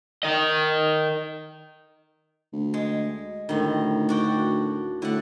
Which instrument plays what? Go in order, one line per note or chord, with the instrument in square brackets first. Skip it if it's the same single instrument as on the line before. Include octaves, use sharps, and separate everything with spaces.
[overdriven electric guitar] A#4 D#5
[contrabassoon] D2
[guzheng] G#3
[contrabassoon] D2 [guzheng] A2 D#3
[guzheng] D4 F#4 G5
[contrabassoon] A2 [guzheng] D3 F#5